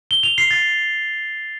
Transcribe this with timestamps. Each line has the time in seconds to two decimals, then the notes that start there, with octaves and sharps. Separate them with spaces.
0.11 G7
0.23 F7
0.38 C7
0.51 A6